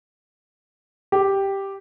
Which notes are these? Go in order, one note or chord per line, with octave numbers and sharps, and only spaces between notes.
G4